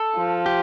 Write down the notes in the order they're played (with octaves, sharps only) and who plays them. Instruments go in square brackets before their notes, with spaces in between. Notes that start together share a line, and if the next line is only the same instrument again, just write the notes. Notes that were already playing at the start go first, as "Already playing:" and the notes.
Already playing: [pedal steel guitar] A4
[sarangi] F3
[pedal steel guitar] G4